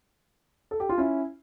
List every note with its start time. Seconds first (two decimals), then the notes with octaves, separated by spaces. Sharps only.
0.71 A4
0.80 G4
0.89 F4
0.98 C#4 E4